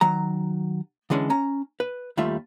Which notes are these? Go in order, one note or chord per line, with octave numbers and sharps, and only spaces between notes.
D#3 F#3 A#5
D3 E3 G#3 C#4 D4
C#4 A#5
B4
D#2 G3 A3 F4 E5